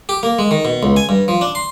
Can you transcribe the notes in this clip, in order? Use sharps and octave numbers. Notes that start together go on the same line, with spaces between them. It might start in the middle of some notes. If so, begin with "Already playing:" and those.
G4
A#3
G#3
D#3
B2
C#2
G#5
G2
F3
D4
C6